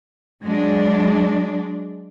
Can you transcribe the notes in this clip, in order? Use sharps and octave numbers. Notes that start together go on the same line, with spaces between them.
F#3 G#3 D4